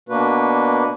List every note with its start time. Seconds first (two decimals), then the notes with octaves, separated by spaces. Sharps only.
0.09 B2 A#3 D4 F#4 B4